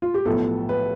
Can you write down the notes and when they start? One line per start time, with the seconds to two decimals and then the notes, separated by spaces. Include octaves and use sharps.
0.02 F4
0.14 G4
0.25 B1 A2 F3 B3 A4
0.69 B4